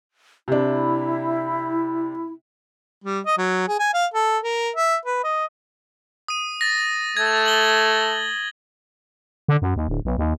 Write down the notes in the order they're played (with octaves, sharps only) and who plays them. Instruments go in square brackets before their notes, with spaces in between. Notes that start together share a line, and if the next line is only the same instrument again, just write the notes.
[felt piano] C3 D4 [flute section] E4
[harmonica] G3
D#5
F#3
G#4
G#5
F5
A4
A#4
E5
B4
D#5
[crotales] D#6 D#7
A6 A#6
[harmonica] A3 [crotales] G#6
[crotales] F#7 G7
[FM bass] D3
F#2
D#2
D1
B1
D#2